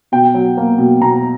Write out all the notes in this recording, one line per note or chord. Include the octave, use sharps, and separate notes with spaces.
B2 G5
F#3
A#3
B2
B2 A#5